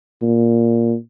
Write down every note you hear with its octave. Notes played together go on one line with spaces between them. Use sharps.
A#2